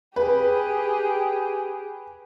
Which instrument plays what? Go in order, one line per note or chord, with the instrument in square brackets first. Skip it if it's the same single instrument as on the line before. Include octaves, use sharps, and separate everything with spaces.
[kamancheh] G4 G#4 [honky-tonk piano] B4